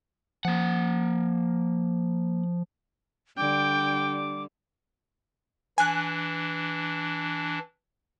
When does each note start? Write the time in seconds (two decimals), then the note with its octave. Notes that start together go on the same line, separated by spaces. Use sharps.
0.45 F3 A#3 F#5
3.38 D3 G3 G5 D6
5.78 E3 D4 G#5 F#6